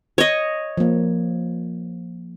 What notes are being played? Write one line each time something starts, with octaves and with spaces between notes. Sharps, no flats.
C#5 D#5
F3 A#3